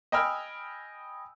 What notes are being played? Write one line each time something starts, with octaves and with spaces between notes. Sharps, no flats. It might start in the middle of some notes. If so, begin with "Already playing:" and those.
D#5 G5 G#5 B5 E6 F6